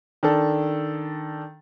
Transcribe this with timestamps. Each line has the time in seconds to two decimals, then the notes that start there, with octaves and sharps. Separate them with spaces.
0.23 D#3 D4 A4